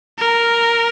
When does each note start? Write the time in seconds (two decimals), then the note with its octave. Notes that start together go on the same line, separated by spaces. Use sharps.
0.19 A#4